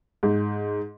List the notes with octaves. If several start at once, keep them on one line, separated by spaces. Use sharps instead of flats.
G#2